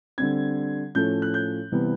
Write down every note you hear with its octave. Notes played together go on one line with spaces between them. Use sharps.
D3 G3 C4 G#6
A2 F3 A3 C#4 G6
F#6
G6
C3 E3 G3 B3